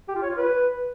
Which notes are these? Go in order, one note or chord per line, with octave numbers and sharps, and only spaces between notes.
G4
F4
C#5
F4
B4